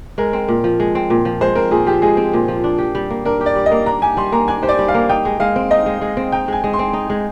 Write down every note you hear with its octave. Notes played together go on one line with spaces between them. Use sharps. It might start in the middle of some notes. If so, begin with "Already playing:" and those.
G#3 A#4
C4
A#2
F3
G#3
C4
A#2
F3
G#3 C5
C4 A#4
A#2 G#4
F3 G4
G#3 G#4
C4
A#2
F3
D4
G4
G3
A#3
D4 A#4
G4
D5
G3
D#5
A#3
D4 A#5
G4 G#5
G3 C6
A#3 A#5
D4 G#5
G4 C5
D5
G3
F5
A#3
D#4 G5
G#3
G#3 F5
C4
D#4 D#5
G#3
G#3
C4
D#4 G5
G#3 G#5
G#3
C6
C4
D#4
G#3